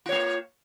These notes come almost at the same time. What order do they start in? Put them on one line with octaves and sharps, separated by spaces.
F4 C#5 A#3